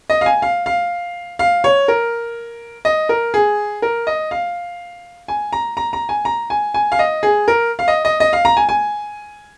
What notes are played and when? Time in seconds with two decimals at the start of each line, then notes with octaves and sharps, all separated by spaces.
0.10 D#5
0.21 F5
0.26 G#5
0.42 F5
0.66 F5
1.39 F5
1.64 C#5
1.88 A#4
2.85 D#5
3.09 A#4
3.34 G#4
3.82 A#4
4.07 D#5
4.31 F5
5.28 G#5
5.53 A#5
5.77 A#5
5.93 A#5
6.09 G#5
6.25 A#5
6.50 G#5
6.74 G#5
6.92 F5
6.99 D#5
7.23 G#4
7.48 A#4
7.79 F5
7.88 D#5
8.05 D#5
8.20 D#5
8.33 F5
8.45 A#5
8.57 G#5
8.69 G#5